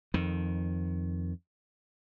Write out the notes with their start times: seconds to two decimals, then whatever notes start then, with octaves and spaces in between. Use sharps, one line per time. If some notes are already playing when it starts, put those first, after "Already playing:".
0.14 F2 D#3